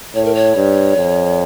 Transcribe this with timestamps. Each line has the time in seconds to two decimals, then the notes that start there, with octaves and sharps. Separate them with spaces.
0.15 A2 C#5
0.25 A#4
0.35 C#5
0.55 G2
0.96 F2